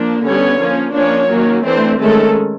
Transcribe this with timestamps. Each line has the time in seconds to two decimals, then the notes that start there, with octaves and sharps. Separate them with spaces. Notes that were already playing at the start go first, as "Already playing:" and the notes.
Already playing: F3 A#3 D4
0.24 D3 G3 B3 C#4 C#5
0.59 F3 A#3 C#4
0.94 F3 A#3 C#4 D4 C#5
1.30 D#3 F#3 A#3 C#4
1.64 E3 A3 C4 D4 C5
2.00 D#3 G#3 A3 C#4 A4